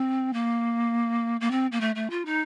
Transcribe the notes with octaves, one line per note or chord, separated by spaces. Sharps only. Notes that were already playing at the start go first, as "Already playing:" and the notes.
Already playing: C4
A#3
A#3
C4
A#3
A3
A3
F4
D#4